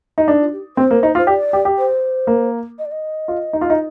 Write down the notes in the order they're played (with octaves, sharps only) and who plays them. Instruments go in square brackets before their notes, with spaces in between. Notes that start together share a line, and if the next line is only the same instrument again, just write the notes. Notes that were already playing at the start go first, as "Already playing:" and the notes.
[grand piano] D#4
[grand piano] D4 [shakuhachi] D#4
[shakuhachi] F4
G4
[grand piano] C4 [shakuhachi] C5
[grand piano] A#3
D#4
F4
[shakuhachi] C5
[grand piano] G4 [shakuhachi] D5
[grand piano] G4
G4
[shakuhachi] C5
[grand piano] A#3
[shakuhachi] D#5
D5
D#5
[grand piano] F4
D#4
F4
D#4